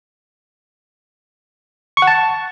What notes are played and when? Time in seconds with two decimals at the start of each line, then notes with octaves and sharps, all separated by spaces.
1.97 C#6
2.02 F#5
2.07 A5